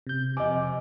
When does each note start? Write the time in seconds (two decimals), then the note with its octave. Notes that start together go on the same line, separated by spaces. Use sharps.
0.07 C3 G6
0.37 F2 C3 D#5 G#5 D6